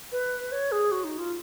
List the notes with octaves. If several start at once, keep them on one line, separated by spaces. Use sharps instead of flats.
B4
C#5
G#4
F#4
D#4
F4